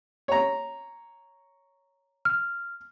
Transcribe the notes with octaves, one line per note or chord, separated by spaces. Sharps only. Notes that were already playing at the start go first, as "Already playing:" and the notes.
C#5 A#5
F6